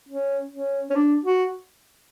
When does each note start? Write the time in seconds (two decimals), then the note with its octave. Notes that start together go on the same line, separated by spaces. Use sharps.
0.09 C#4
0.52 C#4
0.90 C#4
0.96 D4
1.25 F#4